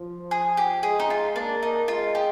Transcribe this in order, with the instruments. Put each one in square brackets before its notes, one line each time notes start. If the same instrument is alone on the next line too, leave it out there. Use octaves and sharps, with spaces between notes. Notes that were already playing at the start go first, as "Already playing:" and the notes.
Already playing: [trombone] F3
[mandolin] G#4
G4
[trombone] G#3 [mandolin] G#4
[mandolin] D#4
F4
[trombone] A#3 [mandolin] D4
[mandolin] D#4
[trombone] G#3 [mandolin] F4
[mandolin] G4